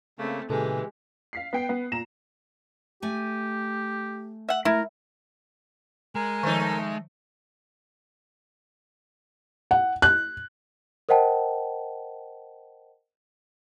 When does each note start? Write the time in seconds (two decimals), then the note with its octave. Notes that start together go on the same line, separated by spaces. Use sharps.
0.19 C#3 A3 A#3 C4
0.50 A#2 C#3 E3 G#3 G4 A4
1.33 F5 B6 C7
1.53 B3 G5 C7
1.69 B3
1.92 A#2 A#5 A#6 E7
3.02 A3 G4 G#5
4.49 E5 F#5
4.65 A3 E4 A#4
6.15 G#3 A#4 G#5
6.43 D#3 F3 A3 D#4
9.71 F#5
10.02 F#6
11.09 A#4 C5 D#5 F#5 G5 A5